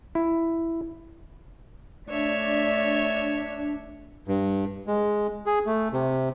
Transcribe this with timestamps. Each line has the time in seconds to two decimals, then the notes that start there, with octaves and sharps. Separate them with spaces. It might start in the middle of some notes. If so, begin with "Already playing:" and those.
0.15 E4
2.07 A3 D4 C#5 D5 E5
4.28 G2
4.87 G#3
5.46 G#4
5.66 A3
5.93 C3